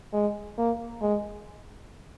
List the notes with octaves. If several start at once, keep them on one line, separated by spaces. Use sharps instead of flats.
G#3
A#3
G#3